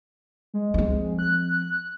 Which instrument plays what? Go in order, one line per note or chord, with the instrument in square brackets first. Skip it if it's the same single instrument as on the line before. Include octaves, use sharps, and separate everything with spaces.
[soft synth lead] G#3
[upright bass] F3 C4
[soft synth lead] F#6